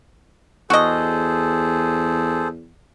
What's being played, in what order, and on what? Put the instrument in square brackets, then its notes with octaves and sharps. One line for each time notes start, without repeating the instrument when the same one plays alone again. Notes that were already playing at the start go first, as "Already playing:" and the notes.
[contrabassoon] E2 [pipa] F#4 D#5 [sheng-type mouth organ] G#4 A4 C5